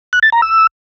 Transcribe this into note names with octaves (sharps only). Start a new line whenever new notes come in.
F#6
A6
A#5
E6